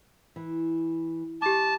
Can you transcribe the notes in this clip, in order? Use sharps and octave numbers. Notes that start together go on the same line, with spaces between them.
E3
G4 A5 D6